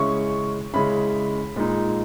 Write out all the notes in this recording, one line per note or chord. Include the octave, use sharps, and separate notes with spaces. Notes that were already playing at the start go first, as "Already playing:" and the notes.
Already playing: C#3 G#3 C#4 E4 C#6
C#3 G#3 C#4 E4 B5
A#2 G#3 D#4